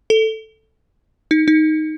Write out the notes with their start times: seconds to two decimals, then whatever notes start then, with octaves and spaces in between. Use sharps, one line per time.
0.10 A4
1.31 D#4
1.48 D#4